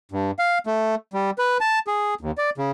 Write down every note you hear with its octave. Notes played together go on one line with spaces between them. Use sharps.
G2
F5
A3
G3
B4
A5
G#4
D#2
D5
C#3